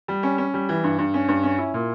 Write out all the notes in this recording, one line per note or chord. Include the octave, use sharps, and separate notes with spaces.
G3
C#4
C#4
G3
E3
G2
G2
C#4
G2
C#4
E4
A#2